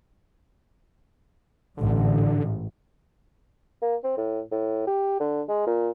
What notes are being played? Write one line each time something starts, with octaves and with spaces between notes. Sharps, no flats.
A1 G#2 D3
A#3
C4
A2
A2
G4
D3
G#3
A#2